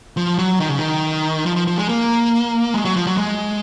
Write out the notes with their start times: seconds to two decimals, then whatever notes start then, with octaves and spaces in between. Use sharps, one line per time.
0.17 F3
0.39 F#3
0.60 D#3
0.68 C#3
0.79 D#3
1.46 F3
1.56 F3
1.67 F3
1.78 G#3
1.89 A#3
2.74 G#3
2.85 F#3
2.96 F3
3.07 F#3
3.17 G#3